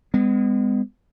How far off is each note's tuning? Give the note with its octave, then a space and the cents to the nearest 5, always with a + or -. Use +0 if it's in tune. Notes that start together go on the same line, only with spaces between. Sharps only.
G#3 -30 B3 +35